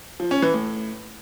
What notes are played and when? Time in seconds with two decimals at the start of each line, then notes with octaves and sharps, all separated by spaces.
0.20 F3
0.31 C#4
0.42 E3
0.54 A2